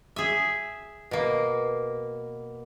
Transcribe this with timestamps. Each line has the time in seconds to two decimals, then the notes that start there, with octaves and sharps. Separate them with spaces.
0.16 G#4 E5
1.11 B2 A#3